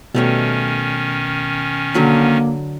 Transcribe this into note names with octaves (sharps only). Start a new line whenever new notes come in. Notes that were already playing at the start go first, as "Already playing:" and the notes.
B2 D#3 G3 A3 C#4 C#5
D3 F#3 A#3 B5